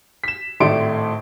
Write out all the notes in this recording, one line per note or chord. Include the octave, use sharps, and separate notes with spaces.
B6 E7
G#1 A2 A3 D5 C6 D7